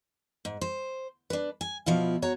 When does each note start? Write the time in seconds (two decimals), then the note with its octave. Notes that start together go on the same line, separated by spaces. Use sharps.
0.45 G#2
0.61 C5
1.30 D4 B4
1.61 G#5
1.86 B2 F3 E4 F4
2.22 F#4 C#5 A#5